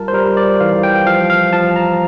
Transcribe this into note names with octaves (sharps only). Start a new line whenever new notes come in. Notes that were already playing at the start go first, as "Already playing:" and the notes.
Already playing: G3 F4 A#4 A5
C5
G3 A#4
D5
E3 F5
G5
F3 F5
F5
F3 A5
A#5